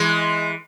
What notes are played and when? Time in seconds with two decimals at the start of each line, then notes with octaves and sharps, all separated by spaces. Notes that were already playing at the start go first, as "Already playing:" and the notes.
Already playing: E3 G#3